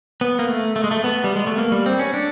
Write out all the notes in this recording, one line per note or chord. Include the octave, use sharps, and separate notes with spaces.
B3
A#3
A3
A3
G#3
A3
B3
G3
G#3
A3
A#3
G3
C4
C#4
D4